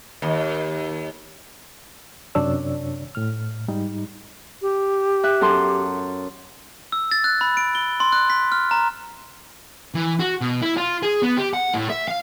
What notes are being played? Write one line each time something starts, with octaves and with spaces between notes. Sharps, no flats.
D#2
F#2 C3 D4 C#5 D5 E6
A2 F6
G#2 G3 D#4
G4
E5 F#6
F#2 A4 C6
E6
A6
F#6
B5
D7
G7
C6
F#6
B6
F6
A#5
E3
F#4
B2
E4
F4
G#4
B3
G4
F#5
A2
E5
F5